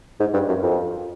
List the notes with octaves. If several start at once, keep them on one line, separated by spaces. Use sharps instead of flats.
G#2
G2
F#2
F2